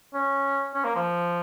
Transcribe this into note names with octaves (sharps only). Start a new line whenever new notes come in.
C#4
C#4
A#3
F3